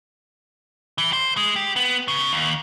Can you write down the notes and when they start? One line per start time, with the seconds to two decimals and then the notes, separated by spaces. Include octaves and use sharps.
0.98 E3
1.13 C5
1.37 G#3
1.56 G4
1.76 B3
2.08 C#3
2.33 D#2